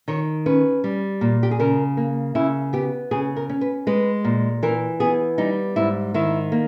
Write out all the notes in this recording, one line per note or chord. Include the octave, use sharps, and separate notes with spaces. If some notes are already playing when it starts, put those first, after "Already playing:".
D#3 C#5
C#4 B4
G3
A#2
G4
G#4
C#3 A#4
A#3
C#3 E4
B3 G4
C#3 G#4
A#4
C#4
B4
G#3 B4
A#2
E3 A#4
B3 G#4
G3 D#4
G#2 E4
D#3 E4
A#3